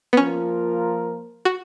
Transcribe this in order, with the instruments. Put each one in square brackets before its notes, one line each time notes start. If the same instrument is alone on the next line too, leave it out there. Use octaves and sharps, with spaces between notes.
[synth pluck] B3
[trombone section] F3 A#3 F4 A#4 [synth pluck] C#4
[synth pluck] F#4